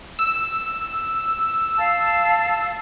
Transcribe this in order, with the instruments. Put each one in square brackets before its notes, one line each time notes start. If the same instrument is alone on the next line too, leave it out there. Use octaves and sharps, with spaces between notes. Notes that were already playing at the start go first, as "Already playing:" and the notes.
[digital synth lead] E6
[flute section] F5 A5